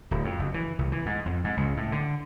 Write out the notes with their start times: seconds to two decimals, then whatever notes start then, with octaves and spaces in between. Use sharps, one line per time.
0.11 D1
0.24 F2
0.39 F#1
0.54 E3
0.79 C2
0.92 E3
1.06 G#2
1.26 F2
1.44 G#2
1.57 C#2
1.77 A2
1.92 D3